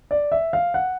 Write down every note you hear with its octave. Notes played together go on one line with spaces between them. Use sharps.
D5
E5
F5
F#5